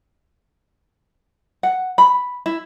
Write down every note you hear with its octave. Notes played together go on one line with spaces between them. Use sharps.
F#5
B5
E4